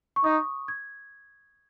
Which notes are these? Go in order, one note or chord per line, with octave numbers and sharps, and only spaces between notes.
C#6
D#4 D#6
G#6